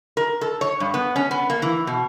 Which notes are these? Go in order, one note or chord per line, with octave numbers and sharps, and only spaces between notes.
A#4
A4
C#5
G2
B3
C#4
B3
A#3
E3
B2